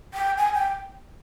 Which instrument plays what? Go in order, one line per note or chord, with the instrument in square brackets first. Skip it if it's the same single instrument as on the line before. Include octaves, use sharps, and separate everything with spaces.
[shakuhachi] G5
G#5
G5